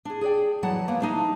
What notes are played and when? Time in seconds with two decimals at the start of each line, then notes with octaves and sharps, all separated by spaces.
0.05 D4 G#4
0.21 G#4 D5 G5
0.63 F2 E3 F#3 F#5 A5
0.88 A#3 B3
1.00 A3 D4 D#4